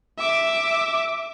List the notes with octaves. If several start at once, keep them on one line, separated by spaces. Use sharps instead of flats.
E5 D6